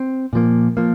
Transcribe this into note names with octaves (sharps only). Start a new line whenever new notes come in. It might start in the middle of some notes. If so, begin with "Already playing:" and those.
Already playing: C4
A#2 F3 A#3
F3 A#3